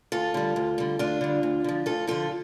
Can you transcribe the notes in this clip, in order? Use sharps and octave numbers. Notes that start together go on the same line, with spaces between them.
D2 F4 A4
D3 G3
D2
D3 G3
D2 D4 F4
D3 G3
D2
D3 F3
D2 F4 A4
D3 F3 F4 A4